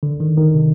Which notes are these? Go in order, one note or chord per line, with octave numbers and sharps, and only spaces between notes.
D3
D#3
D#3
C3